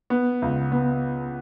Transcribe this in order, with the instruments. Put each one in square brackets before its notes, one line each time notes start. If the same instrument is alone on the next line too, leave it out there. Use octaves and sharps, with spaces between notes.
[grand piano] B3
C#2
B3